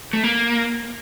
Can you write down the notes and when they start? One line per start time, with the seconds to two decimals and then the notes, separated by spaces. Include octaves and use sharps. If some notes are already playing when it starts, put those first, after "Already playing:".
0.13 A3
0.24 A#3